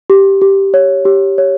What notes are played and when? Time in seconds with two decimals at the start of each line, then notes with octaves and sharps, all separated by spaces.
0.10 G4
0.41 G4
0.74 C#5
1.05 G4
1.38 C#5